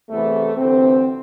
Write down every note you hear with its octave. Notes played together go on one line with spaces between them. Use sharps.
E2 C3 E3 A3
D2 C3 E3 C4